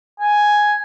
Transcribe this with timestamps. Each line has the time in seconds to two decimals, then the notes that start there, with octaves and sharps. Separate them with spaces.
0.20 G#5